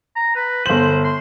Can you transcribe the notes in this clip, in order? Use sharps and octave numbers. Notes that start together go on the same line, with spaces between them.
A#5
B4
G1 C5 F#7
C6